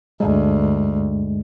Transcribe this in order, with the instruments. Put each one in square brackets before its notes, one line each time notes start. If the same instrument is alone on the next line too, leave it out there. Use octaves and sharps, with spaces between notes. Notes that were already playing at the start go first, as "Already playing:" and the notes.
[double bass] D2 [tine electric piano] G2 G#3